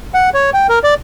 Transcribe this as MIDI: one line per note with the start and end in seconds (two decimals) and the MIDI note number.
0.14 0.29 78
0.34 0.50 73
0.54 0.67 79
0.69 0.79 70
0.84 0.94 74